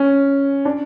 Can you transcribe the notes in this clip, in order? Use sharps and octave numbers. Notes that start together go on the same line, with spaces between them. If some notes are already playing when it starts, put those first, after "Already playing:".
Already playing: C#4
D4